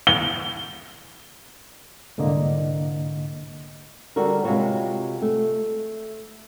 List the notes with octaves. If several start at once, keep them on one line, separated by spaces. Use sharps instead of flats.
G7
C2 G#2 D3 A#3 D#5
D3 G3 F#4 A4 A#4
C3 G#3 F4 F#4 B4 C#5
A3